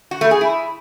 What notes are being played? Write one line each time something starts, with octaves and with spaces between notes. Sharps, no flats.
F#4
A3
G#4
E4